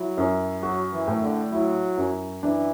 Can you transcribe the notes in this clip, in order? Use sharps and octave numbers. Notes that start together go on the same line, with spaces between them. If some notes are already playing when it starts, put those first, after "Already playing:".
Already playing: F#3 E4
F#2
F#3 F#4
E3
A2
D3
F#3 E4
F#2
E3 D4